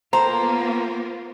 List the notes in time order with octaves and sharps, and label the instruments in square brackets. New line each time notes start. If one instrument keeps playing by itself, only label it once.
[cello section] A#3 B3 F4 [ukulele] A4 G5 A#5 [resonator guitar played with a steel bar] C5